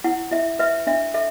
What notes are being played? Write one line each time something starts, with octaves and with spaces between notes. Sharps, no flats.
E4 F#5
E4 E5
B4 E5
D4 E5
A4 E5